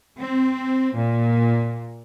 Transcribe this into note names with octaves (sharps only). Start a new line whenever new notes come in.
C4
A#2